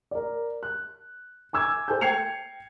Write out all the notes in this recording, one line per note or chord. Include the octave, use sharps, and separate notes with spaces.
A#4 D5
F#6
G#5 D6 E6 G#6
A4 C5 G#5 A5 G6
G5 G6 G#6 C7 C#7 F7